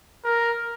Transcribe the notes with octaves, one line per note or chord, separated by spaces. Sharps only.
A#4